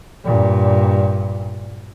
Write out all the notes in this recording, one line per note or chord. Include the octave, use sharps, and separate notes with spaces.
G2 A#2